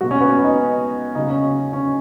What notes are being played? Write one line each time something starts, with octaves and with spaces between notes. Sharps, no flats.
B2 F#3 F#4
C#4
B3
C#4
D#4
C#3 F#3 D#4
C#4
C#4